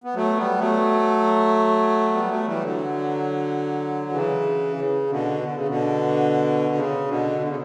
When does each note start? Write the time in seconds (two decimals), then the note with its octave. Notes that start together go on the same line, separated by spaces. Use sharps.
0.04 B3
0.15 F#3 A3
0.37 G3 B3
0.58 F#3 A3
2.13 G3 B3
2.29 F#3 A3
2.46 E3 G3
2.62 D3 F#3
4.11 C#3 E3
4.76 C#3
5.10 B2 D3
5.43 D3
5.55 C#3
5.67 B2 D3
6.75 C#3
7.08 B2 D3
7.41 D3
7.48 C#3